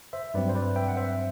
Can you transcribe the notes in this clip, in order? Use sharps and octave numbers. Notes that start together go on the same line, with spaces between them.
C5 E5
G2 F#3 C4 B4 D5
C5
B4 D5
E5 G5
F#5
C5 E5